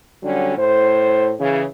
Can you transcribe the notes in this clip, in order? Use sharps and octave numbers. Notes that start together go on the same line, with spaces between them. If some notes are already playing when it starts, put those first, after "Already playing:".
D3 F#3 G3 C#4
A2 C5
C#3 E3